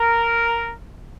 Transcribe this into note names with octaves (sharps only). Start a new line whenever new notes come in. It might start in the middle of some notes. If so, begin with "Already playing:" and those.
Already playing: A#4